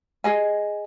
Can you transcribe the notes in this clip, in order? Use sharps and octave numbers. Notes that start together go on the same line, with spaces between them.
G#4 D#5 G#5